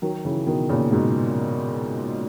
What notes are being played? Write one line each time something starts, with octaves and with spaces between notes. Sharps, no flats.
D#3 F#3
C#3 E3
B2 D#3
A#2 C#3
G#2 B2